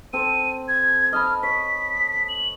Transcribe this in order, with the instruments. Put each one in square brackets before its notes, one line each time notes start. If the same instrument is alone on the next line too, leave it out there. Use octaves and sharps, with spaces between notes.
[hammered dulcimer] C4 A4 [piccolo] D#7
[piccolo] G#6
[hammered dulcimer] D#5 A5 B5 [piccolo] F6
[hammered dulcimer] C#5 [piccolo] B6
[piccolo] F#7